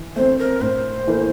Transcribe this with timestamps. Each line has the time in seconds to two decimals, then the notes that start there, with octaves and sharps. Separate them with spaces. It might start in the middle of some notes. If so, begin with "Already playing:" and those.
Already playing: E3
0.16 A3 C4 C5
0.38 A#4
0.61 A2 C5
1.07 E3 A#3 E4 A4